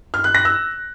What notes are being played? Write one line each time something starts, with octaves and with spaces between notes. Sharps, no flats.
F6
F#6
A#6
E6